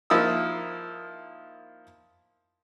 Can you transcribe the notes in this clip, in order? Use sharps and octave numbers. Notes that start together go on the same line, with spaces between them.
F3 A#3 D#4 E4 D#6 E6